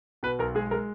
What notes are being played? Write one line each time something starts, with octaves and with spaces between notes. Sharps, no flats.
B2 B4
B1 A#4
G#3 G#4
G#3 A#4